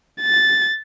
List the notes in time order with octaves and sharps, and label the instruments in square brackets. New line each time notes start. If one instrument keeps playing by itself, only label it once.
[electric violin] A6